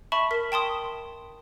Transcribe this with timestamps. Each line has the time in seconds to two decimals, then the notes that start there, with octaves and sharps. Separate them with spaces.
0.12 E5 A5 B5 C#6
0.31 A#4 B6
0.52 G5 A5 C6 D#6